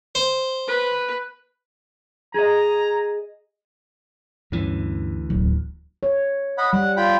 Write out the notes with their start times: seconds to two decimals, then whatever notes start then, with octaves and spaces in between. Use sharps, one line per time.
0.15 C5
0.68 B4
2.34 G#4 D#5 A#5
4.52 D2 G2 E3 C#4
5.30 D1 B1
6.03 C#5
6.58 D#5 F#5 B5
6.73 G3 F#5
6.97 F4 G5 B5